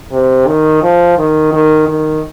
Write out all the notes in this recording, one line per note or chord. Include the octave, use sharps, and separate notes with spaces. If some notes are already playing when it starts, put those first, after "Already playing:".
C3
D#3
F3
D#3
D#3
D#3